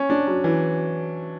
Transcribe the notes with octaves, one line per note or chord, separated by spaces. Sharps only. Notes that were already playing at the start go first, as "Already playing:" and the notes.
Already playing: C#4
D4
F#3
E3